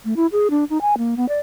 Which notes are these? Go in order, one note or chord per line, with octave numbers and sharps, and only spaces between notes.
A3
E4
G#4
D4
D#4
G#5
A#3
B3
D5